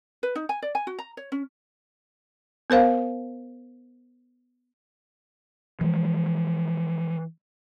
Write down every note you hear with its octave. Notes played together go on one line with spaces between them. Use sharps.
B4
D#4
G#5
D5
G#5
F#4
A#5
C#5
C#4
B3 A#4 C5 F5
E3 F3 G#3